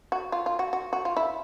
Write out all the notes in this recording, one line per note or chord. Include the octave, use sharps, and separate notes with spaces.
F#4
F4
F4
F#4
F#4
F#4
F4
E4